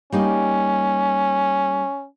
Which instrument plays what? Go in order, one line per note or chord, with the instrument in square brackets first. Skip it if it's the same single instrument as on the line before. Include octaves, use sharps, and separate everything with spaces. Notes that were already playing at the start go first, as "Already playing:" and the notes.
[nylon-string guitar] G3 A#3 D#4 [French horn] C#4